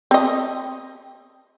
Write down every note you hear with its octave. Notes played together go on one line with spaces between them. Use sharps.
C4 D#5